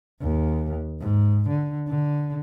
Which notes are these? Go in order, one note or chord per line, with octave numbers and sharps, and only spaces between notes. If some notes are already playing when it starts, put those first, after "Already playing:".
D#2
G#2
D3
D3